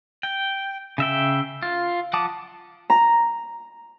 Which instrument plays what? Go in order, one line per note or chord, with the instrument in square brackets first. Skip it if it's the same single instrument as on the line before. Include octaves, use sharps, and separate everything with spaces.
[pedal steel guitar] G5
C#3 E5 G5
F4
F3 F#5 A5 D6 D#6
[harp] A#5